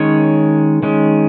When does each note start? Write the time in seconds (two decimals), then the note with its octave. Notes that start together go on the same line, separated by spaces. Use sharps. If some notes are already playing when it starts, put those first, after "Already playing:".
Already playing: D#3 G#3 C#4 C#5
0.83 D#3 G#3 C#4